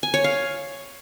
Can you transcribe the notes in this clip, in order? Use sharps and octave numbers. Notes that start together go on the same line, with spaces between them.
G#5
C#5
F5